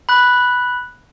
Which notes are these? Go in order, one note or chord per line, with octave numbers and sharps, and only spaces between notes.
B5 F#6